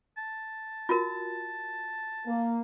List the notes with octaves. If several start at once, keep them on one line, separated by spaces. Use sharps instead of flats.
A5
F4 F#4 A#4
A#3